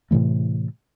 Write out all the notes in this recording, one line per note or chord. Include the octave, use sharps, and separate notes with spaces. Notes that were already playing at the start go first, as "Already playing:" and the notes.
A2 C3 E3 A3